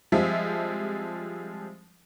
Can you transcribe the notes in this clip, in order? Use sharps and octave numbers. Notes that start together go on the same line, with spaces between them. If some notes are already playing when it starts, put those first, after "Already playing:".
F3 G3 G#3 C4 F4 E5